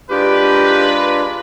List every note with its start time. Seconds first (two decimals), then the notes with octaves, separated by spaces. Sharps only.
0.10 G#3 D4 F4 G4 A#4 B4